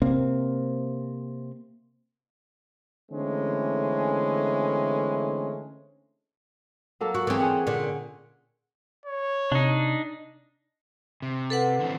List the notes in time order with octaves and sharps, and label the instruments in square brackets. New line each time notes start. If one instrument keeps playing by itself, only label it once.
[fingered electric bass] C3 A#3 C4
[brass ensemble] D3 E3 G#3 A3 C4 C#4
[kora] F#3 A#3 A4
[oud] F#4
[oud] E3 C4 [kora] G#4 C#5 D5
[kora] C#4 G#4 F#5
[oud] A#2 D3
[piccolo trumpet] C#5
[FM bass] C3 [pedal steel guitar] D4 D#4
[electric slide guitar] C3
[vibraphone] A4 B4 F#5
[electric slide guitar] D3 E3 C4